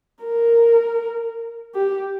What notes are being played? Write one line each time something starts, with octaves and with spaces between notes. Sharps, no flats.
A#4
G4